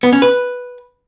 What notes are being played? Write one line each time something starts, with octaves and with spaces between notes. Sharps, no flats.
B3
C#4
B4